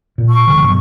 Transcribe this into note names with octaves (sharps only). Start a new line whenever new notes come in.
A#2
C#6
E1 D3 F3
G2 B2 F#3